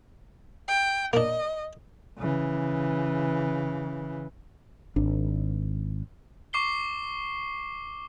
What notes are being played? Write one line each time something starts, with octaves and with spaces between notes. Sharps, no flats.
G5
A#3 D4 D#5
C#3 E3
G#1 D4
C#6 D6 C7 G7